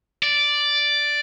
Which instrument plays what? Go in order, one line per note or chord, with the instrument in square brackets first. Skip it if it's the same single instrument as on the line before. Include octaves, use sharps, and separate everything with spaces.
[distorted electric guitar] D5